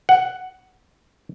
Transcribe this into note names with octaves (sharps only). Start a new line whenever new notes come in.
F#5